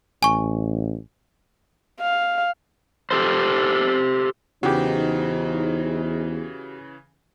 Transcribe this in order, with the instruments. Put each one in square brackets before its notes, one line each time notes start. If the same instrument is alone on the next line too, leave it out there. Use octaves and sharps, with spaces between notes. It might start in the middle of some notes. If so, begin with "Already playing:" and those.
[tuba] A1 [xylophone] G#5 C#6
[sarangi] F5
[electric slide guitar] G4 A4 C5
[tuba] E2 [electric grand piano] C#3 E3 [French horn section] D#4 C5 [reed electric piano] F#4 G4